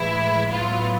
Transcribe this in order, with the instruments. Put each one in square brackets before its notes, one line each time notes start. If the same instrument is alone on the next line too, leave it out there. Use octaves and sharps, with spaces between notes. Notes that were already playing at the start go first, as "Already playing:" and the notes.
Already playing: [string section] A2 E3 G#3 E4
A2 F#3 B3 E4 F4